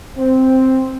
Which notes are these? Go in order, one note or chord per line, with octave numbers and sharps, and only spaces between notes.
C4